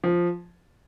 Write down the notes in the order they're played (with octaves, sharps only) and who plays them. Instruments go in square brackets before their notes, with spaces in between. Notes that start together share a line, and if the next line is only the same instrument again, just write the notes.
[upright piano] F3